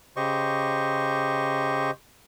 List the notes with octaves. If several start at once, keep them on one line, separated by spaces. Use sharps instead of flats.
C#3 G4 C5 D#5 C#6